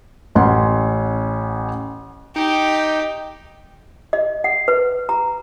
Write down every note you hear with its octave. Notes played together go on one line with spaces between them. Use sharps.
A1 C#4 F#5 C6
D#4 G4
D#5
F#5
B4
A#5